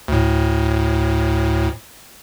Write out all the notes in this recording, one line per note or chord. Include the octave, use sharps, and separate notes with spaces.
D2 A2